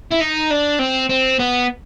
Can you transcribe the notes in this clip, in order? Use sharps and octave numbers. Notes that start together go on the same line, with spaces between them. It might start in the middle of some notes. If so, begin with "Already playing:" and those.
E4
D#4
D4
C4
C4
B3